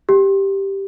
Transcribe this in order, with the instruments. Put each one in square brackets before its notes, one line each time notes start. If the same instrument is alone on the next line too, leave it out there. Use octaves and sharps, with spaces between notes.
[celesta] G4